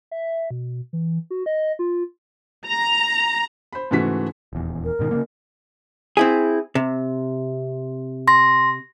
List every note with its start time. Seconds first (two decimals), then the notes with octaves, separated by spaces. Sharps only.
0.11 E5
0.51 B2
0.93 E3
1.31 F#4
1.46 D#5
1.79 F4
2.66 A#5
3.73 C5 B5
3.91 G#2 C#3 E3 A3 F#4 B6
4.53 D#1 E2
4.85 A#4
4.99 G#2 B2 D#3
5.11 C#3 F3 A#3
6.17 C4 E4 G#4
6.75 C3
8.28 C6 A#6